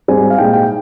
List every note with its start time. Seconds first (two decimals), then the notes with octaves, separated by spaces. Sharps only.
0.08 G#2 G3 C4 G#5
0.30 F5
0.38 A#2 G#3 D#4 G5
0.53 G5